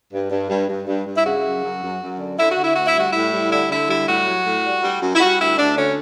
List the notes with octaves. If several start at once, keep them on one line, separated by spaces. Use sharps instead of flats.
G2
G2
G2
G2
G2
G2
E4
C#3 F#4
F#2
F#2
F#2
F#2
D3
D3 E4
F#4
D3
E4
D2 F#4
E4
G3 F#4
A2 E4
G3
D3 E4
D3 E4
G3 E4
A2 F#4
F#3
A2
G3
G3
F#2
E4
G3 F#4
D2 E4
D2 D4
D3 C#4